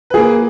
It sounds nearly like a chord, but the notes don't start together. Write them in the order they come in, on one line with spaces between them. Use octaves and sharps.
B4 G#4 A#3